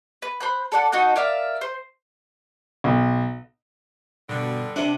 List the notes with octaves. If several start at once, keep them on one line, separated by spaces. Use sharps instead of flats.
B4
C5 B5 F#6
A4 D5 F#5
D#4 F#4 A4 F#5
A#4 D5 E5 F5
C5
B1
G2 B2 D3
C3 D4 E5 F#5